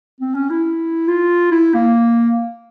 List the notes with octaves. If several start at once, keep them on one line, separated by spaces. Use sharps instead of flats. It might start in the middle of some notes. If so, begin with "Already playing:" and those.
C4
C#4
E4
F4
E4
A#3